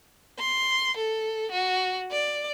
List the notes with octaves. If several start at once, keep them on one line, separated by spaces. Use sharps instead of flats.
C6
A4
F#4
D5